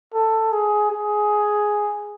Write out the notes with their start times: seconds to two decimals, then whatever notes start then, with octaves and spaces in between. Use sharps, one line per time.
0.14 A4
0.53 G#4
0.91 G#4